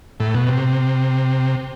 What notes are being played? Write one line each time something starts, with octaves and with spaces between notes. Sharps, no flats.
A2
B2
C3